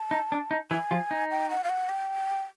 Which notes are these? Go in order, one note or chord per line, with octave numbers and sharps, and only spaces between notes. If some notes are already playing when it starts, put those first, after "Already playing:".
Already playing: A5
D#4
D4
D#4
E3 E4 G#5
F3 F4
D#4
G5
F#5
F5
F#5
G5